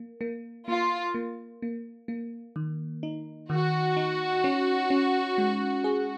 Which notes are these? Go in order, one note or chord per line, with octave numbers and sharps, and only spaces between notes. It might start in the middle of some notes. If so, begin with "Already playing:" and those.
Already playing: A#3
A#3
A#3 F4
A#3
A#3
A#3
D#3
D#4
D#3 F#4
D#4
C#4
C#4
G#3
G#4